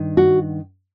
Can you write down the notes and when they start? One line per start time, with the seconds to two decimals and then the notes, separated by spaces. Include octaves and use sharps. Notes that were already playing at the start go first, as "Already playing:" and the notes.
Already playing: G2 D#3
0.17 F#4